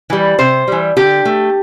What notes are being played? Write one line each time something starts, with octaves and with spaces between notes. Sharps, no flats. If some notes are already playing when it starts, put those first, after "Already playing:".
E3 G3
C3 C5
E3 G3
D3 G4
A3